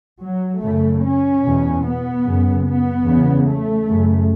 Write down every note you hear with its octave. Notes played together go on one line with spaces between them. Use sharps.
F#3
F#2 C#3 A3
C#4
E2 B2
B3
F#2 C#3
B3
E2 C#3
A3
F#2 C#3